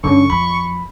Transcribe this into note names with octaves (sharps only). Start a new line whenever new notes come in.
G2 D3 C#4 C#6
F2 B5